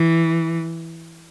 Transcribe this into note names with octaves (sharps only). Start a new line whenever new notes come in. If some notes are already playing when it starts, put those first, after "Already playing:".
Already playing: E3